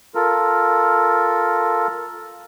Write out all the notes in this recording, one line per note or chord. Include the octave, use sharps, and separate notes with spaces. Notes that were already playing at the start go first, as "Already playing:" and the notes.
F4 A4 A#4